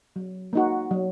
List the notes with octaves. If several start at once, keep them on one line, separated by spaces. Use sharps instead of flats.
F#3
A#3 D#4 F#4
F#3